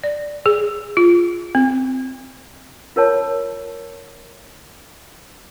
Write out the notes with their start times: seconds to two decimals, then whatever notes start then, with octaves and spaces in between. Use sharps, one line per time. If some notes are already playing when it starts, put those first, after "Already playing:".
0.04 D5
0.46 G#4
0.97 F4
1.55 C4
2.96 F4 A#4 C#5 A5